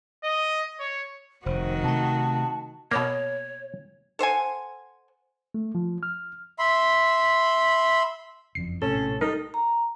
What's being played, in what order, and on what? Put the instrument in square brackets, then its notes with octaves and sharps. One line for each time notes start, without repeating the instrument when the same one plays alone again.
[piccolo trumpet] D#5
C#5
[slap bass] F1 [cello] D#3 F#4 [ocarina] C5
[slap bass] C3 A3 [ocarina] A5
[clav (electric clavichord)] B2 A#3 [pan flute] C#5
[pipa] A4 C5 F#5 G#5
[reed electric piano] A3
F3
F6
[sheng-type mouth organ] E5 B5 C6
[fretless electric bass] F#1 F2 [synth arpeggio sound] C7
[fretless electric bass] A#1 A2 C3 [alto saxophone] C#4 [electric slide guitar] A4
[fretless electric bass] G3 [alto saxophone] D#4 [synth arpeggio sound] A#4
[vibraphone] A#5